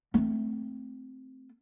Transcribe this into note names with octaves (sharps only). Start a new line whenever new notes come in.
A3 C4